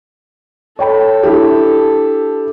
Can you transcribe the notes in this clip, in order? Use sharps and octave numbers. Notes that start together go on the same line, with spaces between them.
A4 C#5 G5 B5
D4 E4 G4